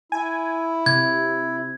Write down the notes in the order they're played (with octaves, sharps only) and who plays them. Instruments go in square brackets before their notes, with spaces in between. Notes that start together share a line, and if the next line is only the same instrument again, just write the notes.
[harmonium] E4 [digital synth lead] G#5
[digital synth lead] C3 [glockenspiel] G#6